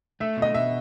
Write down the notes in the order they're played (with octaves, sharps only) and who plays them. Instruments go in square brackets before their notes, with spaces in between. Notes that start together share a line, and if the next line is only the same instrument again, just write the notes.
[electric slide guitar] A3 [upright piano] E5
[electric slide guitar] B2
[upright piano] D#5
[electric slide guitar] B2 [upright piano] E5